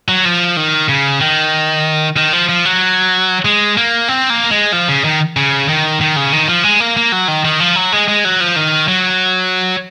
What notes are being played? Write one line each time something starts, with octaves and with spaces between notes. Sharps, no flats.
F#3
F3
D#3
C#3
D#3
D#3
F3
F3
F#3
G#3
A#3
C4
A#3
G#3
F3
C#3
D#3
C#3
D#3
D#3
C#3
D#3
F3
G#3
A#3
A#3
F#3
D#3
D#3
F3
F#3
G#3
G#3
F#3
F3
D#3
F#3